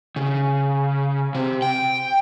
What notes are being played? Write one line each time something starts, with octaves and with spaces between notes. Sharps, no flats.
C#3
C3
G5